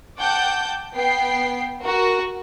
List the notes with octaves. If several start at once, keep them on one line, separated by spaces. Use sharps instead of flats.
F#5 G5 A5 D6 G6
B3 G5 C7
F#4 A#4